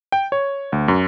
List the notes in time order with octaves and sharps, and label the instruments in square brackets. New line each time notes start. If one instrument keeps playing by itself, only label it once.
[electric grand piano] G5
C#5
D2
F#2